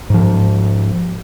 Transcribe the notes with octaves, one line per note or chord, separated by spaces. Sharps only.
G#2 F3